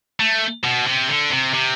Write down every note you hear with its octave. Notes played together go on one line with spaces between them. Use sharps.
A3
B2
C3
D3
C3
C3